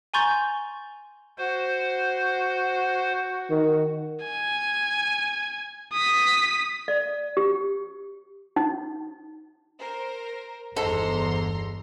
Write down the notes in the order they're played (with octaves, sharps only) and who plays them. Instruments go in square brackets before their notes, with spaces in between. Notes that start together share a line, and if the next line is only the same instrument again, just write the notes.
[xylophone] G#5 A#5 C6 C#6 G6 A6
[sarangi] F#4 [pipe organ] C5
[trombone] D#3
[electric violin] G#5
D#6 B6
[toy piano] D5
G4
D#4
[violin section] A#4 C5
[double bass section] G1 E2 [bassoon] G#2 [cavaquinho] A4 [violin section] A#5 C6